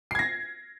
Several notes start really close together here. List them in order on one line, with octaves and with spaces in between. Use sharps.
C7 G#6 A#6